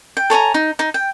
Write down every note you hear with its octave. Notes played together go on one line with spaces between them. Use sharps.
G5
A4 C#5 G#5 A#5
D#4
D#4
G5